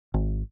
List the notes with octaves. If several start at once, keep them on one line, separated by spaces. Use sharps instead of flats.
G#1